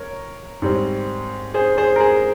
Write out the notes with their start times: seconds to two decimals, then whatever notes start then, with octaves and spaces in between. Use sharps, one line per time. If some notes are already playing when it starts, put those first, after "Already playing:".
Already playing: A#4 C#5
0.62 G#2 G3 C4
1.54 G#4 C5
1.78 G#4 C5
1.96 A#4
2.01 G#4